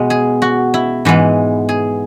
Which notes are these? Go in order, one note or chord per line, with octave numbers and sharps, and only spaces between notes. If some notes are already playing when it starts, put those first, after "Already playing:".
Already playing: B2 G#3 B3
G#4
F#4
E4
G#2 E3 G#3 B3
G#4